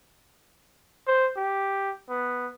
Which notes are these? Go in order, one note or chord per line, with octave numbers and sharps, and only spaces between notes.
C5
G4
B3